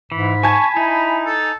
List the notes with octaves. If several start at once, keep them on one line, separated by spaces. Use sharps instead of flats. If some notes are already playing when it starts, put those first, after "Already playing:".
G#2 E3 B5
G#5 A5 C#6 G#6
D#4 E4
A4